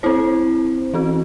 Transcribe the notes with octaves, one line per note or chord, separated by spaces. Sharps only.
C4 E4 C5
E3 C4 F#4